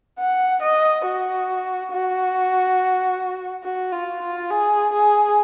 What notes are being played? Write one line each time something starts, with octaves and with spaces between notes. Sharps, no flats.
F#5
D#5
F#4
F#4
F#4
F4
F4
G#4
G#4